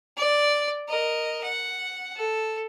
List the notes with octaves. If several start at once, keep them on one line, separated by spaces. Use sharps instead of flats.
D5
A#4 D#5
F#5
A4